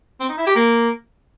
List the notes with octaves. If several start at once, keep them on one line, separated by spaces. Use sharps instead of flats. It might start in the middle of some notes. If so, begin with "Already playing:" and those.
C4
D#4
E4
G4
A#3